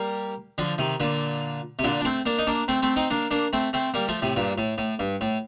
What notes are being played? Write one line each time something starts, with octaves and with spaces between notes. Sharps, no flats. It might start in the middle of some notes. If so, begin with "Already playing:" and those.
Already playing: G3 A#3
D3 F3
C3 D#3
A#2 D3
C3
A#2 D3
D4
A3 C4
A#3 D4
D#4
A#3 D4
A3 C4
A3 C4
C4 D#4
A#3 D4
A#3 D4
A3 C4
A3 C4
G3 A#3
F3 A3
A2 C3
G2 A#2
A2
A2
G2
A2